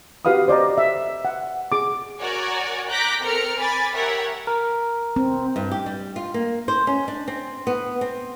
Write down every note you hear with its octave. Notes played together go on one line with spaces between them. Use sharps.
F#4 G4 B4 F5 B5 D#6
C5 D5 D#5 A#5
E5
F#5
G#4 D6
F#4 A#4 C#5 D5 F#5 G#5
A#5 D6 F#6 G6 A#6 B6
C4 A4 A#4 F6 C#7
G#5 B5 D6 A6
G4 A#4 C#5 E5 F#5
A#4
C4
G2
G4
G3
F4
A#3
C5
C#4
D4
C4
B3
C4